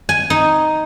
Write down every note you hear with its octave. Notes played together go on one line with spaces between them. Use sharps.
G#5
D#4